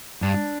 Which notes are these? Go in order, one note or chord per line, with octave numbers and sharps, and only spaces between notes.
G2 D4